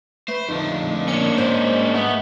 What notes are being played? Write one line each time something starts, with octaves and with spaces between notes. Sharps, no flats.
A3 B4 C5
F2 D3 D#4
A#3 C#4 D4 C#7
G#2 C5
A3 B3 E5